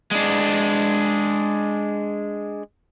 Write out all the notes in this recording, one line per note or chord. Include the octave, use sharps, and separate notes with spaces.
G#3 D4